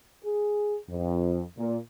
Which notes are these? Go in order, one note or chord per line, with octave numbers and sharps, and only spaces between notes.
G#4
F2
A#2